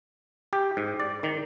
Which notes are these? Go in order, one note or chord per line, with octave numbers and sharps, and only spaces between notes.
G4
G#2
D5
D#3